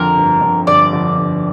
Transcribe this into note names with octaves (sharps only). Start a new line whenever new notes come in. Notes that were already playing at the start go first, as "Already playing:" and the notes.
Already playing: F2 D3 A#4
G1
F2 D3
G1 D5
F2 D3
G1